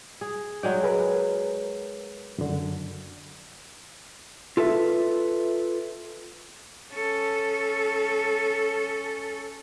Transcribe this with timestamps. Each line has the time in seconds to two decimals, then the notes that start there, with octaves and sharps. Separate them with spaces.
0.21 G#4
0.63 F#3 G#3 D5 G5
0.84 G#4 A#4 B4
2.38 F#2 D3
4.57 F4 A4 B4 E5
6.91 C#4 A4